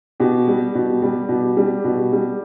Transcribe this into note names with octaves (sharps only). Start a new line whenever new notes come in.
B2 G4
G3
B2
G3
B2
G3
B2
G3